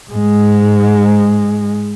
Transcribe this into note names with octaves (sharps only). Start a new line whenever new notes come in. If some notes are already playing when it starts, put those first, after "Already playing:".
G#2 G#3